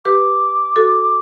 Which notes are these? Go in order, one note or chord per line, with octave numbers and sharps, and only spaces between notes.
G4 B4 D6
F#4 A4